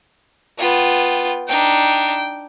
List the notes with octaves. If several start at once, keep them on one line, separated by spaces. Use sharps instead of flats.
B3 F4 G5
D4 D#4 G5